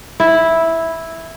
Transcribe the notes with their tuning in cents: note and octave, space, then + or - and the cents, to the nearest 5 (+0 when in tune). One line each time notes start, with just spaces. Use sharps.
E4 -5